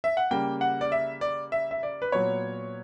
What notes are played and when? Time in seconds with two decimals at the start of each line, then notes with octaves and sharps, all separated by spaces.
0.04 E5
0.17 F#5
0.31 C#3 G3 A#3 G5
0.61 F#5
0.81 D5
0.92 E5
1.21 D5
1.52 E5
1.71 E5
1.83 D5
2.02 B4
2.12 A#2 F#3 B3 C#5